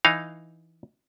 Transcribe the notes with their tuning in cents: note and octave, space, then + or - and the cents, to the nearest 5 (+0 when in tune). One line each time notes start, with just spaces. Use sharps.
E3 +0 D#4 +0 F5 +0